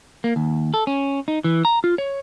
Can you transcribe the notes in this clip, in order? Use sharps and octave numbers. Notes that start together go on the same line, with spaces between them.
A#3
D#2
A4
C#4
D#4
E3
A#5
F4
C#5